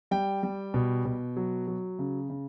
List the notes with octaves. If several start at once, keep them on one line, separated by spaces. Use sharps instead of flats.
G3 G5
G3
B2
B2
F#3
F#3
C#3
C#3